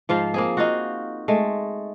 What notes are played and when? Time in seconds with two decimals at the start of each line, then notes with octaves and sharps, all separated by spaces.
0.09 G#2 F3 F4 C5
0.34 A#3 C4 G#4
0.57 D#4 F4 F#4
1.28 G#3 A3